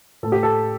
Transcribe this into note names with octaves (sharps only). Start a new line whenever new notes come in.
A2 A4
G4
A4